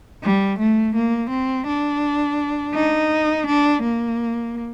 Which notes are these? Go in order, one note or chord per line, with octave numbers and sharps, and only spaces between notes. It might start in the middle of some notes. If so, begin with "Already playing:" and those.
G3
A3
A#3
C4
D4
D#4
D4
A#3